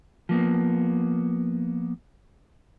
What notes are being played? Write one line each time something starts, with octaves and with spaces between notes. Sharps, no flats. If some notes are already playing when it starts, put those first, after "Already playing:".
F3 A#3 B3